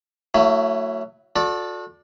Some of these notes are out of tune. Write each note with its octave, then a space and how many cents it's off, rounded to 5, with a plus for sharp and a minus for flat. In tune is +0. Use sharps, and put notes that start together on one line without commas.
F#3 +0 A3 +40 E4 +0
F#4 -40 A4 +0 D5 +0